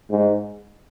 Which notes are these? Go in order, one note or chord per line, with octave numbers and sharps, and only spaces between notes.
G#2